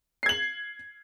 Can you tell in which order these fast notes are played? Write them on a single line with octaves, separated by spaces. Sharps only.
C7 G#6 F#7